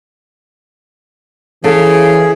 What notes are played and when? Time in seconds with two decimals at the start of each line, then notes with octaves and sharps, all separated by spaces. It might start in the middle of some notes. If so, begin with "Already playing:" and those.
1.64 C#3 E3 G#4 A4 F5